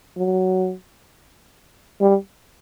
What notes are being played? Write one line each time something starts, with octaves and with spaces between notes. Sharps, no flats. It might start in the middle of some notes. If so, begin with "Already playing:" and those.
F#3
G3